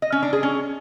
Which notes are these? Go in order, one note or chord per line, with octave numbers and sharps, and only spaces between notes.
D#5
C#4
D4
G#4
C#4